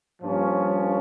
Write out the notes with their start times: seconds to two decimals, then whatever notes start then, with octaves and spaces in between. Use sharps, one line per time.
0.22 G2 F3 A#3 C#4